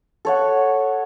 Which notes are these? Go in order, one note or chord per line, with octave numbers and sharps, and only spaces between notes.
A4 C#5 F#5